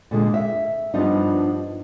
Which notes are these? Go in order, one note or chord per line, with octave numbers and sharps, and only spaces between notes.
A#2 D3 G#3
E5
G2 F3 G3 B3 D4 D#4